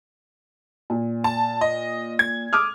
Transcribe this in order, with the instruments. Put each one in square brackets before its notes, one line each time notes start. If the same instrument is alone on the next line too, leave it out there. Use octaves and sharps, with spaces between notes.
[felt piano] A#2
[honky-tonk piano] A5
D#5
G#6
[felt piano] D6 D#6 F6